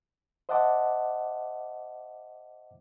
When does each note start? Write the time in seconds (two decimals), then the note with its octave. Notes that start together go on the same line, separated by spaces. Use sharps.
0.49 C5 D#5 E5 F#5 A5 D6